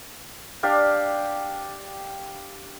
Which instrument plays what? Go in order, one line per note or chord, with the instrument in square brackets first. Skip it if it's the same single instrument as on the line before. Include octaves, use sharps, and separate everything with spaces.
[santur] D4 G4 F5